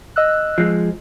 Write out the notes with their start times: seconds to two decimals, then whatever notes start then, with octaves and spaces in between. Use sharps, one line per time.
0.16 D#5 E6 F#6
0.58 F3 G#3